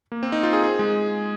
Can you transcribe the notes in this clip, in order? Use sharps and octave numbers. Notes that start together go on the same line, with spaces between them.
A#3
C4
D#4
F4
G#4
G#4
G#3